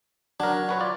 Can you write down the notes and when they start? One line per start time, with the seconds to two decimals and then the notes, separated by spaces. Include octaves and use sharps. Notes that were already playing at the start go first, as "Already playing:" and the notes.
0.40 F#3 D4 A#4
0.69 F#4 B4 C#5
0.80 F4 D5